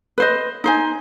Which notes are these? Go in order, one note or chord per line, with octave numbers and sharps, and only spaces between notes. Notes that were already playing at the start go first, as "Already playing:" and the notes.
B4 C5 D#5
D#4 C5 G#5